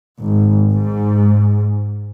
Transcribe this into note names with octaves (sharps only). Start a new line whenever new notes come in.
G#1
G#2